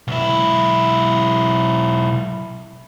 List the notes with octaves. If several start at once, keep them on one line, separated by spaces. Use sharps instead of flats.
B1 E4